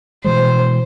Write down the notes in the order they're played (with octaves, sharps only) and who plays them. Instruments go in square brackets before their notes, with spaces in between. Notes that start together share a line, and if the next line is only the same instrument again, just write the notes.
[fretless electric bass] B2 E3 G#3 [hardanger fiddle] C5